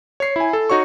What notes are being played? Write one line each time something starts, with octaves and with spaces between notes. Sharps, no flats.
C#5 C7
E4 G#5
A4
D#4 F#4 C#5 C#6